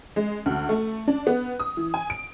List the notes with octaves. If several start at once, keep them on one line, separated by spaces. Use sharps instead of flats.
G#3
D2
A3
D4
B3
D#6
E3
G#5
D7